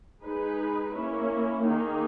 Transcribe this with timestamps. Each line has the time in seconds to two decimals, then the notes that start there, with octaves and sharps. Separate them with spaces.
0.23 G#3 D#4 G#4 B4
0.94 A#3 C#4 E4
1.65 D#3 A#3 D#4 G#4